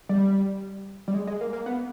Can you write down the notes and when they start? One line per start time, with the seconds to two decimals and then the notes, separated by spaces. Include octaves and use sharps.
0.09 G3
1.08 G3
1.14 G#3
1.27 G#3
1.41 A#3
1.53 A#3
1.66 B3